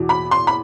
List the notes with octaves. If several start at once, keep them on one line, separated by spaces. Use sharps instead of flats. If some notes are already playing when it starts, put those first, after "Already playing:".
Already playing: E2 B2
B5
C6
B5